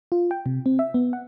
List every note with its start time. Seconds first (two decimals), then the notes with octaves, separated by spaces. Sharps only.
0.12 F4
0.31 G5
0.46 C3
0.66 C4
0.79 E5
0.94 B3
1.13 F#5